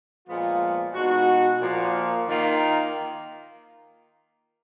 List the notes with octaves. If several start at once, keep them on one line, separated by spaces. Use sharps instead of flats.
A#2 F3 G#3 B3 F4
B2 G#3 D#4 F#4
A#2 F3 A#3
D#3 A#3 F4